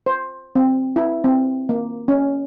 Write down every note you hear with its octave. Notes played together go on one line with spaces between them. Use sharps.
C5
C4
E4
C4
A#3
C#4